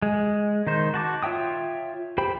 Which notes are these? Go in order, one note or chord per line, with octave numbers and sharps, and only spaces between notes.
G#3
D#3 D#4 C5
F#4 A5 D6
F4 C#5 E5 G5 D#6
G4 C5 G5 B5